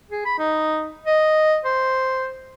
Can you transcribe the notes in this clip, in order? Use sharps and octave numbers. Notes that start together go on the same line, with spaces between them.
G#4
B5
D#4
D#5
C5